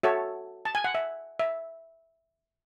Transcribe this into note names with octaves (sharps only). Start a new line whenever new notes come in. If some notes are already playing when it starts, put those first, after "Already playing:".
F#4 A4 C#5 E5
A5
G#5
F#5
E5
E5